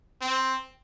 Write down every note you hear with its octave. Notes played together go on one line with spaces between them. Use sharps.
C4